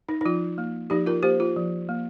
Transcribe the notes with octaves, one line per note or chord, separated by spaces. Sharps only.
D#4
D#4
F3 F4
A#3
F3 D#4 G4
F4 A#4
A#3 G4 C5
F4
F3
A#3